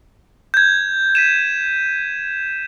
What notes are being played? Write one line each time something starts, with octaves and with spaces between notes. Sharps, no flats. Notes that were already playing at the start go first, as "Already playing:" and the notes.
G6 G#6
B6 D#7 E7